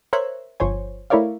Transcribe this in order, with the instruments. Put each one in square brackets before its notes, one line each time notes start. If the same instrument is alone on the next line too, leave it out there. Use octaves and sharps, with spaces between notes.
[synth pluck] A#4 C5 C#5 E5 F#6 G#6
G1 F3 C5 C#5 G#5
A3 E4 A#4 C#5 D5 F5